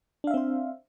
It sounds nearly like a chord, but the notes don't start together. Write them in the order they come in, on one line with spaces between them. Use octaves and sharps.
D4 F5 E5 C4 C5